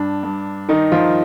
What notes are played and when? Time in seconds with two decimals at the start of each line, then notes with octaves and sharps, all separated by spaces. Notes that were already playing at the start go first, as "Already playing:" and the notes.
Already playing: G2 D4
0.23 G2
0.69 D#3 D#4
0.92 F3 F4